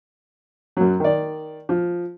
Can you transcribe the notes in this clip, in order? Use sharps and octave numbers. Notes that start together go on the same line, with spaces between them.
F#2 F#3
D#3 D5
F3